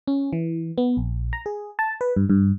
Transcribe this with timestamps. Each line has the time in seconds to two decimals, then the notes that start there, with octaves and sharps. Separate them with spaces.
0.08 C#4
0.33 E3
0.78 B3
0.97 A#1
1.33 A#5
1.46 G#4
1.79 A5
2.01 B4
2.16 G2
2.30 G2